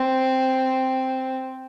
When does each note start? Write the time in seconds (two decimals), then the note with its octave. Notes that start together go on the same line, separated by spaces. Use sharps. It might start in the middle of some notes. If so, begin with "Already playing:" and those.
Already playing: C4